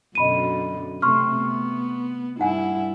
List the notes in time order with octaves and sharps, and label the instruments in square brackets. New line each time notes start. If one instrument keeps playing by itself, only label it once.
[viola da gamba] F#2 B2 D3 [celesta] D#5 B5 D#7
[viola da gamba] C3 A3 C4 [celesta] C6 C#6 F6
[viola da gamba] B3
[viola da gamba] G2 E4 [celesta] D#4 F#5 G#5